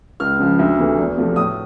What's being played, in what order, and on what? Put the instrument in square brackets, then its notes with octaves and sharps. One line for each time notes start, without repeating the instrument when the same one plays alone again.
[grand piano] C#2 F6
C#3 F3
D2
C3 E3 A3
E2
C3 F3 A3
A2 D#6